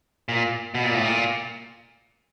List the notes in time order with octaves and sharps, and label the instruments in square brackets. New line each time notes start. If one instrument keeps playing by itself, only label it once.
[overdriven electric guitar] A#2
B2
A#2
A2
A#2